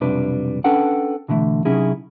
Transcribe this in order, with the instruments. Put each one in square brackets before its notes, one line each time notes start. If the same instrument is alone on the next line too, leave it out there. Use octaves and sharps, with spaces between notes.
[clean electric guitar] B1 F2 C3 G3 D4 B4
C#4 D4 A4 B4 F#5 G5
B2 D3 E3 F3 A3
C3 F#3 C#4 D#4 E4 G#4